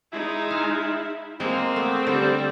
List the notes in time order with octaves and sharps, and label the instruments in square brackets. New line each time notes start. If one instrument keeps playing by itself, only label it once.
[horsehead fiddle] G#3 D#4 [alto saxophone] E4
[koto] F5
[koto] G#3 [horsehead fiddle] A#3 [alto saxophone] C4
[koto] A3 B3
[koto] D3 [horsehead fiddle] G3